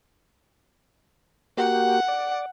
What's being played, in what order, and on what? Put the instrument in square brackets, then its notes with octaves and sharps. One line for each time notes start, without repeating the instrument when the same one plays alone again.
[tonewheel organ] A#3 F#4 G4 [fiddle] F#5
[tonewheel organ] D5